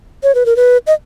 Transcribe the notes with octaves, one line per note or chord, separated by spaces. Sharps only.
C#5
B4
A#4
B4
D#5